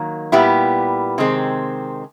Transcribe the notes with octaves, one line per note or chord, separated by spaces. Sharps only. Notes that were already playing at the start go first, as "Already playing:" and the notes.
Already playing: D#3 F#3 A#3
A#2 G3 B3 E4 G4
C3 D#3 G#3 C4